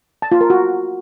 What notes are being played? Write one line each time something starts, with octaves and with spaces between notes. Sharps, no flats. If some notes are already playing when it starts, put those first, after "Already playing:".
A5
F4
A#4
F#4